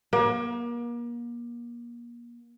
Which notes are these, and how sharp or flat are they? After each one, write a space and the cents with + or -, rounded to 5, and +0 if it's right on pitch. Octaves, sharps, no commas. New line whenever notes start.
A#3 +35